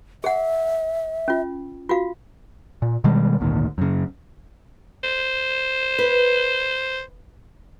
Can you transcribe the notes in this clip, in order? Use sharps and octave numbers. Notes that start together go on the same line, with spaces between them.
G#4 E5 F#5
C#4 F4
F4 F#4 F5
A#2
B2 D#3 G3 G#3
G#1 D2 A#2 D#3
F#2 C#3
C5
B4